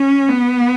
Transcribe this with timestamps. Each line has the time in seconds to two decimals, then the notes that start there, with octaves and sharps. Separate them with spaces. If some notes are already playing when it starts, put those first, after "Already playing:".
Already playing: C#4
0.28 B3